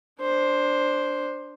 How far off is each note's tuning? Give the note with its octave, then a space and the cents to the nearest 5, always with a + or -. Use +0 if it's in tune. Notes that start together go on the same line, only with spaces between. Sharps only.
D4 +0 C5 +5